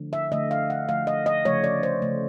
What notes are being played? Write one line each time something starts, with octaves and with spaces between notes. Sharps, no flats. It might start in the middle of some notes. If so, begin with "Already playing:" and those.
Already playing: D3 F3 A3
E5
D3 F3 A3 D#5
F5
F#5
D3 F3 A3 F5
D#5
D#5
C#3 F3 A3 C#5
D5
C5
C#3 F3 A3